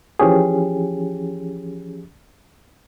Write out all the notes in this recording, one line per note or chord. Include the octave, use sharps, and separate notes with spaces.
E3 F3 C#4 G4 G#4